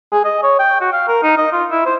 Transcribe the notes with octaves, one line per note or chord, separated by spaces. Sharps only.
G#4
D#5
C#5
G5
F#4
F5
A#4
D#4
D#5
F4
E4
C5